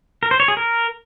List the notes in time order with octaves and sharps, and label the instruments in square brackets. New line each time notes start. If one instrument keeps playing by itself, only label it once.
[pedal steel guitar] A#4
C5
C#5
G#4
A#4